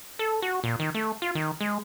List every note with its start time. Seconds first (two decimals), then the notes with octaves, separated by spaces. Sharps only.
0.19 A4
0.42 F#4
0.64 A#2
0.80 D#3
0.95 A3
1.22 F4
1.35 D#3
1.61 G#3